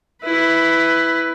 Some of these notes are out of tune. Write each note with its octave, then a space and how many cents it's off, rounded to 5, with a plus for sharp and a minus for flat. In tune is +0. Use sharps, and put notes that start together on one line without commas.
E4 +0 B4 +15